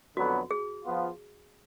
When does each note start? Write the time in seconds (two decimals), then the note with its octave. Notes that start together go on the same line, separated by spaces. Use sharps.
0.17 F2 D3 F#3 B3 F#4
0.51 G#4
0.84 F3 B3 F4